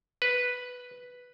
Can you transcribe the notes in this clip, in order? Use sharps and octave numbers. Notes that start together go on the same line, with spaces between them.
B4